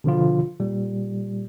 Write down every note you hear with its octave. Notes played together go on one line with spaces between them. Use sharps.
B2 D3 F3 F4
A#2 G3